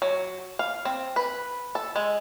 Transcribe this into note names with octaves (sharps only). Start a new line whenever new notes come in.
F#3
F5
C4
B4
A4
G#3